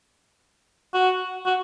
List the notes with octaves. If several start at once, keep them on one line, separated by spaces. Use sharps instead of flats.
F#4
F#4